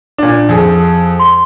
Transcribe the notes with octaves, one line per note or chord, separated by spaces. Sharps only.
A#2 D4
F2 G#4
C6